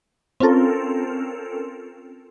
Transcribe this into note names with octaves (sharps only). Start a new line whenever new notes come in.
C4 C#4 F4 A4 A#4